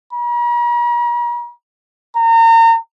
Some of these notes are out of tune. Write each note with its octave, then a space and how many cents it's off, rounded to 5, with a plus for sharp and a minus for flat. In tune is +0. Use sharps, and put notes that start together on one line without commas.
A#5 +45
A#5 -35